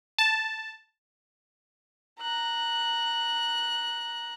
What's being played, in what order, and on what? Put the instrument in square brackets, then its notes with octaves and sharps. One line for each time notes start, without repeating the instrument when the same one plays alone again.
[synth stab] A5
[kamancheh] A#5 F#6